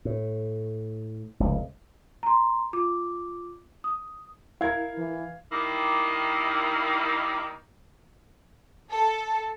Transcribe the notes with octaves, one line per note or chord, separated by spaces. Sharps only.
A2
F1 C#2 G2
A#5 C6
F4 D6
D#6
E4 A#4 F5 G#6
E3
D#3 G3 A#3 D#4 E4
A4